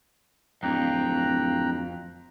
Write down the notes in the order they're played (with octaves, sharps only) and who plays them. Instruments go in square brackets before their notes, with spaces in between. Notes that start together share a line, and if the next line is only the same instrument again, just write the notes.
[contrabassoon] D1 [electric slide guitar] F2 [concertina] G5 A#5 F#6